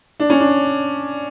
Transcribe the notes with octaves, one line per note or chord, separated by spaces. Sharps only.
D4
C#4
D4